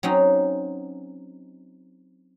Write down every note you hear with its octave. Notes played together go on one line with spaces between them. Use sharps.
F#3 C4 C#4 D#4